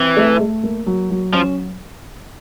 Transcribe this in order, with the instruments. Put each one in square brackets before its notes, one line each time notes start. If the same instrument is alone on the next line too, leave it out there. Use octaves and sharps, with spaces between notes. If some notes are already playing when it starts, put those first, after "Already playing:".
Already playing: [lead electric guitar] E3 [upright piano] C4
[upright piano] A3
A3
A#3
F#3
F#3
[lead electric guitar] F3 [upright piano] C#4